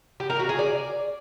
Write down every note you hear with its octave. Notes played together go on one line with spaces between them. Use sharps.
G4
A#4
F#4
G#4
D5